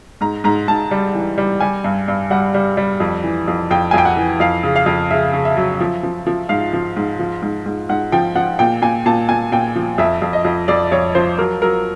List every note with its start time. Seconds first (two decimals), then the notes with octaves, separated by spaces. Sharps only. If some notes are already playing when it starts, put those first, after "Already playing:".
0.21 G#2 A#5
0.44 G#2 A#5
0.68 G#2 A5
0.91 G3
1.15 E3
1.38 G3
1.61 G3 G#5
1.84 G2
2.08 G2
2.30 G3 F#5
2.54 G3
2.77 G3
3.00 F2
3.24 E3
3.48 F2
3.71 F2 G5
3.91 G#5
3.94 F2 G5
4.05 F#5
4.17 E3
4.40 F2 F5
4.63 C#3
4.76 F5
4.86 F2
5.11 C#3 E5
5.33 C#3
5.45 E5
5.57 F#3
5.80 F3
6.03 F3
6.27 F3
6.49 G#2 F5
6.73 F3
6.96 G#2
7.19 F3
7.42 G#2
7.66 G#2
7.89 G#2 F#5
8.12 F3 G5
8.36 F3 F#5
8.59 A#2 G5
8.82 A#2 G#5
9.06 A#2 A5
9.29 A#2 G#5
9.52 A#2 G5
9.76 F3
9.98 F2 E5
10.22 F2
10.33 D#5
10.45 F2
10.68 F2 D5
10.92 F2 C#5
11.15 F3 C5
11.38 F#3 A#4
11.62 F#3 A#4